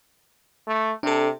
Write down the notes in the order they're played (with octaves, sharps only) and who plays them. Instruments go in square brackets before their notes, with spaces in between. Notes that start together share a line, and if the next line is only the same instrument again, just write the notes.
[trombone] A3
[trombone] C3 [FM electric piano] D4 A4